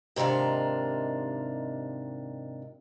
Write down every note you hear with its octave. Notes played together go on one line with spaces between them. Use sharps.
G#2 C3 D#3 D4 F4